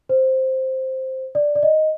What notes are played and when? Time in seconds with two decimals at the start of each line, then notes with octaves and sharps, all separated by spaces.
0.09 C5
1.35 D5
1.55 D5
1.63 D#5